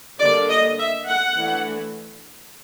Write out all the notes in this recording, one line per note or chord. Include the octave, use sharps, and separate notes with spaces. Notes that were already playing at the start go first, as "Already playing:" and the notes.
D3 G3 A#3 D4 D5
D#5
E5
F#5
E3 A3 D4